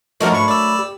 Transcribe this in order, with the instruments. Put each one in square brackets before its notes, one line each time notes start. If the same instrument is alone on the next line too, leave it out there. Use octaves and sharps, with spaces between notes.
[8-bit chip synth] F3 F#4 [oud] F#3 D4 A#4 [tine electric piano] A3 [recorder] D#5
[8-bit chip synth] G#2 C#6 [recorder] B5
[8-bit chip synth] D5 E6
[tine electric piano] G4